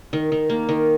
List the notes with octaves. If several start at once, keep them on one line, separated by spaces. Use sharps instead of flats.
D#3
D#3
A#3
D#3